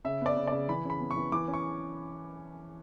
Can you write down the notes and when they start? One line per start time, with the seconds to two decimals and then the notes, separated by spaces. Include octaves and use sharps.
0.05 C#3 E5
0.21 B3 D5
0.37 C#3
0.47 C#3 D5
0.69 E3 B5
0.85 C#3 B5
1.00 B3
1.11 C#6
1.16 E3
1.32 E3 D6
1.48 C#4
1.54 C#6